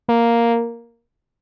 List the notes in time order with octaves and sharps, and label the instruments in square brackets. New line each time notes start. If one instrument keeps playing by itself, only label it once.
[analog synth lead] A#3